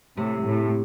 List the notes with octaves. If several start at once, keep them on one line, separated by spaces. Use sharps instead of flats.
A2 C3
A2